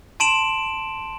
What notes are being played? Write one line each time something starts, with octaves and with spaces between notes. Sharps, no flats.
A5 C6 D7 E7 F#7